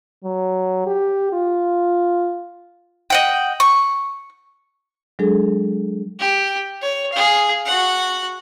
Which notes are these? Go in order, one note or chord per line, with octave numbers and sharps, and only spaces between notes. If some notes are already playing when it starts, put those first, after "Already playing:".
F#3
G4
F4
D#5 F#5 G5
C#6
F#3 G#3 D4 G#4 A4
G4
C#5
G#4 F5
F#4 F#5